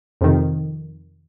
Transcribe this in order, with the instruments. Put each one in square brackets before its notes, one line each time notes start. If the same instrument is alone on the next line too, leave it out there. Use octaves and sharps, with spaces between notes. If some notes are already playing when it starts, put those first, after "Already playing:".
[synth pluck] F2 C3 D#3